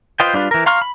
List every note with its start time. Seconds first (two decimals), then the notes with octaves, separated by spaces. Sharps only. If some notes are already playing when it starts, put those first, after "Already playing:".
0.20 F4 B4 C5 D#5 G5
0.33 G3 D4 F4 B4
0.51 E3 A#4
0.66 F5 A#5 C6 C#6 F6
0.82 B5